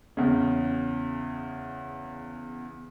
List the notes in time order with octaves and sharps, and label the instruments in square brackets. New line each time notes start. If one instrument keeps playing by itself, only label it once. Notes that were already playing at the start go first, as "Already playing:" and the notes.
[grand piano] E2 C#3